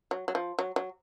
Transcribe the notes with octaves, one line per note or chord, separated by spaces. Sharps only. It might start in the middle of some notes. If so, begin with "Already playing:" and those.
F#3
F#3
F3
F#3
F#3